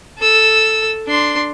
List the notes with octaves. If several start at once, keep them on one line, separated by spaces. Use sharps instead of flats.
A4 E6
D4 C6